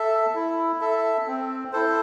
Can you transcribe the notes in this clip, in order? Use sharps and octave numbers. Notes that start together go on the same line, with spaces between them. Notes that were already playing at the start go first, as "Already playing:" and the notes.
Already playing: A4 E5
E4
A4 E5
C4
E4 A4 C5